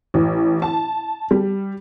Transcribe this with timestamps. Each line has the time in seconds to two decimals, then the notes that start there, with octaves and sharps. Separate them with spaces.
0.14 A1
0.62 A5
1.31 G3